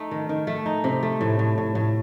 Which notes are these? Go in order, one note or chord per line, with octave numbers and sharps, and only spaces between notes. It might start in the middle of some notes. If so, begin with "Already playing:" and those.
Already playing: A3 D#4
D#3
D#3
A3
D#4
C3
A3
A2
A2
A2
A2